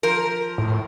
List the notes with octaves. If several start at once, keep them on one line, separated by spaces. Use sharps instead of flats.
F3 A#4
A2